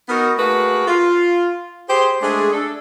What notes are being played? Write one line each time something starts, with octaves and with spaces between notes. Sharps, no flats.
B3 D#4 F#4 A#4
A3 A#3 F#4 G#4 B4
F4
G4 G#4 C5
G#3 A3 D4 G#4
D4 A4